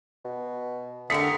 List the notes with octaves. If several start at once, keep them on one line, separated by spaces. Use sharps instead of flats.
B2
D3 A3 D#4 G4 A#4 B6 C#7